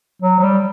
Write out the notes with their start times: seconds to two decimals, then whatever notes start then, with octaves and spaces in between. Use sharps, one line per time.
0.22 F#3
0.39 F#3
0.43 G3